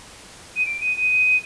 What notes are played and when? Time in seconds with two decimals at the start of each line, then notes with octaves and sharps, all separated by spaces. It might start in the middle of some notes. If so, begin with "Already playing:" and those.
0.56 D#7
0.66 D7
0.81 D#7
0.97 D#7